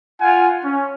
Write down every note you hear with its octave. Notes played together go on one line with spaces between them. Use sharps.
F4 F#5 G#5
C#4